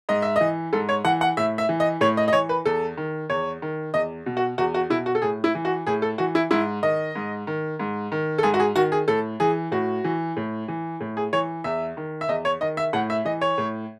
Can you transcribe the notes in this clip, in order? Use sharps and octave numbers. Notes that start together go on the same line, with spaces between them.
G#2 D#5
E5
E3 D#5
G#2 A4
C#5
E3 F#5
F#5
A2 E5
E5
E3
D#5
A2 C#5
D#5
D#5
E3 C#5
B4
E2 A4
D#3
E2 C#5
D#3
E2 D#5
B2
F#4
E2 F#4
F#4
B2 E4
F#4
A4
A2 G#4
E4
E3
F#4
A2 G#4
A4
E3 F#4
E4
G#2 E4
D#3 D#5
G#2
D#3
G#2
D#3
A4
G#2 G#4
F#4
G#4
D#3 F#4
G#4
A2 A4
E3 G#4
A2 F#4
E3
A2
E3
A2
G#4
E3 C#5
E2 E5
D#3
E5
E2 D#5
C#5
D#3 D#5
E5
A2 F#5
E5
E3 D#5
C#5
A2